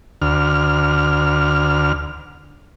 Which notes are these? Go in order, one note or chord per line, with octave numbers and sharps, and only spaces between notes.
D2 F6